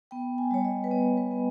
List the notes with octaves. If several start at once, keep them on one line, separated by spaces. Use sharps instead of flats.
B3 G5
G#5
G3 C#5
D#5
B4
B3 C#5
B4
B3